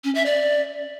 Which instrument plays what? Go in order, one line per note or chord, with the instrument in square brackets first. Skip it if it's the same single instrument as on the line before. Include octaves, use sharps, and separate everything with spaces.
[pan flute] C#4
E5
D5